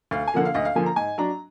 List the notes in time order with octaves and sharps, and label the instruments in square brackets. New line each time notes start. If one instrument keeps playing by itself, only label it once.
[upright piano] D2 F5
G#5
D3 F3 A#3 F#5
F5
D2 D#5
F5
D3 F3 A#3 G#5
A#5
G#2 G#5
F#3 D4 A#5